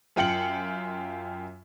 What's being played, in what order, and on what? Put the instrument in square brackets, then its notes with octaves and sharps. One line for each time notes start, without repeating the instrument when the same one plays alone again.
[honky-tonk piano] F#2 F4 G5 C#7 F#7